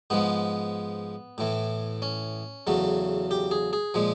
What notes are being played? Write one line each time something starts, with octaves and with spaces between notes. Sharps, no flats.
G#2 F3 G#3 B3
A2 E3 A3
C#4
E2 C#3 F#3 A3
G4
G#4
G#4
A#2 F3 G#3